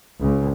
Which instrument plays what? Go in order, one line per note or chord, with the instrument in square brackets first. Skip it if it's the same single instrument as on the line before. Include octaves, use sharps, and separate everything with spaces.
[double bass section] C#2